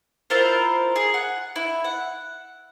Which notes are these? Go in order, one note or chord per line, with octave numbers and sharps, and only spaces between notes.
E4 F4 A#4 C5
G#4
F#5
E4
F#5